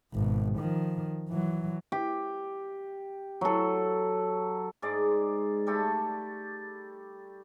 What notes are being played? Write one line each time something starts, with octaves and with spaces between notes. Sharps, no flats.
G#1 B2
D#3 F3
E3 F#3
G4
F#3 A4
G#2 G#3 D5
G3 A3 G4 A4